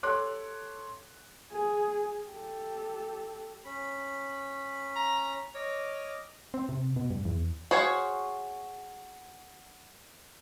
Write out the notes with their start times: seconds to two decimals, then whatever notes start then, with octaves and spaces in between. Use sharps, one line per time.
0.03 G4 A4 C#5 C6 D6 F#6
1.52 G#4
2.29 G4 A4
3.65 C#4 B5
4.96 A#5
5.55 C#5 D#5 D6 F6
6.54 C4
6.69 C3
6.96 B2
7.11 G2
7.25 E2
7.71 F#4 G#4 C5 C#5 F5